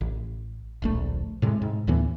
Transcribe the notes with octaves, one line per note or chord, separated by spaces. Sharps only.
A1
D1 A#1 A3
A2 C3 G#3
G#2
D2 A2 E3 B3